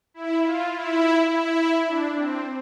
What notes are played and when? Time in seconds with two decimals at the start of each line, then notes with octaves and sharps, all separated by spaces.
0.14 E4
0.43 F4
0.72 E4
1.29 E4
1.87 D4
2.15 C4